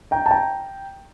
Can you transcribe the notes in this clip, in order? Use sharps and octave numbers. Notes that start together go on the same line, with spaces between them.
G5 A#5
A5
G5 A#5